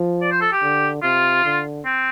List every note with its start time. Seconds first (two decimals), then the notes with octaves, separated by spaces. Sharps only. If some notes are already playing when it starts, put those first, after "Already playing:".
Already playing: F3
0.22 D5
0.32 C5
0.41 A4
0.52 G4
0.62 D3
1.03 C3 F4
1.45 D3
1.85 C4